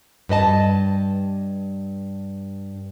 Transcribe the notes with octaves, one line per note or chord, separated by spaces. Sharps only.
G2 B4 D#5 A5